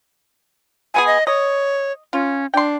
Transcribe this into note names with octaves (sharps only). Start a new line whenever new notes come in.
G#3 B3 G#4 G#5
D#5
C#5 D#5
C#4 F4
D4 G5 C6